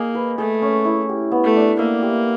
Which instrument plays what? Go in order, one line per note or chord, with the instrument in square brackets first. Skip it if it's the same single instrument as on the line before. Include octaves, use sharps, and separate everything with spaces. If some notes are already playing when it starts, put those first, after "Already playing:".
Already playing: [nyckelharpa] A#3 [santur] G#4 D#5
[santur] B4
[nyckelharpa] A3 [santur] G#4
[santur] C#4
E4
G4
B3
[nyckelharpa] A3
[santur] D4
[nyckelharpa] A#3 [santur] E5
[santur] G4